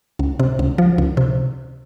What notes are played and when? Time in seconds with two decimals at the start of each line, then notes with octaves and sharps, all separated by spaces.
0.19 C#2
0.40 C3
0.59 C#2
0.78 F3
0.98 C#2
1.17 C3